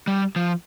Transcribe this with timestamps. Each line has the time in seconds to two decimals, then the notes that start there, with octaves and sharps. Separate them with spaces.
0.08 G3
0.36 F3